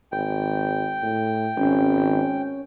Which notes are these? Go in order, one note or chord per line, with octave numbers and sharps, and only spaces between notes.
G#1 G5
A2
G#1 C#4